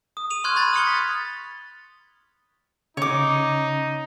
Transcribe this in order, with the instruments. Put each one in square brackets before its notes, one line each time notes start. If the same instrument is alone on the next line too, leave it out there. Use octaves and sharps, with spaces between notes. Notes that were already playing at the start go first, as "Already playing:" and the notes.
[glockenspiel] D#6
D#7 F7
C6 C#6 F6 F#6 G#6
B5 G#6 A6 F#7
D#6 F6 A6 C#7 F7 G7
D#6 B6
[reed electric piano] C#3 C#4 [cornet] D#4 [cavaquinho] C#5 D6